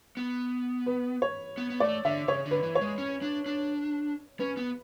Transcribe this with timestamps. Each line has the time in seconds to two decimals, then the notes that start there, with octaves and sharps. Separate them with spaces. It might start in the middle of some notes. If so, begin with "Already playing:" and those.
0.17 B3
0.86 B4
1.22 C#5
1.57 B3
1.70 B3
1.80 A3 D5
2.05 D3 E5
2.28 C#3 C#5
2.46 D3
2.51 B4
2.63 E3
2.75 C#5
2.81 G#3
2.98 C#4
3.22 D4
3.46 D4
4.39 C#4 B4
4.57 B3